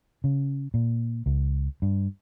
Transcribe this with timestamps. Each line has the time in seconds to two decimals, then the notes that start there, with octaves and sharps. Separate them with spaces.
0.24 C#3
0.74 A#2
1.26 C#2
1.82 G2